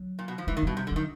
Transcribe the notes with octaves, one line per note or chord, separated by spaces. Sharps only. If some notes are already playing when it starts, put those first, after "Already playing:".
Already playing: F#3
A#2
B2
F3
E3 G#3
D#3
B2 G3
C3
D3
D#3 F#3